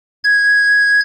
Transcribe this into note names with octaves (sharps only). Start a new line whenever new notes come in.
G#6